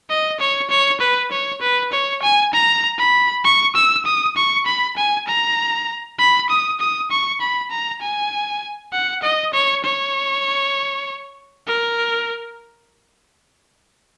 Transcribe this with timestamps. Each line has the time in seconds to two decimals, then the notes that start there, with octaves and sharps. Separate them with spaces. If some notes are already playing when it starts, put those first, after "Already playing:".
0.10 D#5
0.40 C#5
0.70 C#5
1.01 B4
1.31 C#5
1.62 B4
1.92 C#5
2.22 G#5
2.53 A#5
2.99 B5
3.44 C#6
3.75 E6
4.05 D#6
4.36 C#6
4.66 B5
4.97 G#5
5.27 A#5
6.19 B5
6.50 D#6
6.80 D#6
7.11 C#6
7.41 B5
7.71 A#5
8.01 G#5
8.93 F#5
9.23 D#5
9.53 C#5
9.84 C#5
11.67 A#4